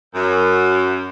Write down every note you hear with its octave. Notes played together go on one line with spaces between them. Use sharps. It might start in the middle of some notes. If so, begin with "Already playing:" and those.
F#2